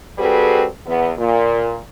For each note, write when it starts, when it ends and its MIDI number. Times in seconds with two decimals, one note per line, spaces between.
0.19 0.65 55
0.19 0.65 60
0.19 0.65 66
0.19 0.65 68
0.19 0.65 69
0.19 0.65 71
0.86 1.11 40
0.86 1.11 59
1.17 1.77 46